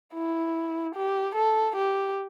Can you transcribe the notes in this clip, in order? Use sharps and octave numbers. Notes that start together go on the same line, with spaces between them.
E4
G4
A4
G4